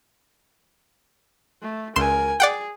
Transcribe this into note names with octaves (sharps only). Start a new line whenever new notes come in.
A3
C#2 A#4 G#5 C6 E7
G#4 D5 F#5 G5